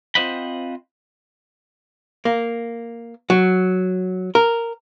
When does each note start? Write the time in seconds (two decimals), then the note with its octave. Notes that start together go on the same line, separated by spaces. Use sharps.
0.15 C4 F4 C5 D#5 F#5 B5
2.25 A#3
3.30 F#3
4.35 A#4